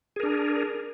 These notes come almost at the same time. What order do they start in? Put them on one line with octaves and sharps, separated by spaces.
G#4 A#4 D4